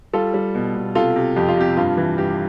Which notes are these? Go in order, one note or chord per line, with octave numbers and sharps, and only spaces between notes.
G3 F4 A4
G3
B2
B2
C3 F4 A4
C3
F2 G4
F4
C3 G4
G2 F4
E3
G2 G4